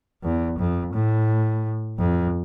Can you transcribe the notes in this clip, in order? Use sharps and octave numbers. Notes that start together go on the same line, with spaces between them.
E2
F2
A2
F2